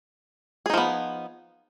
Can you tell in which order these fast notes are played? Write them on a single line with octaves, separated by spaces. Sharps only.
G#4 D#4 F3 B3